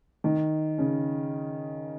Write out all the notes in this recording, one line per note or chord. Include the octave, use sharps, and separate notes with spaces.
D#3
C#3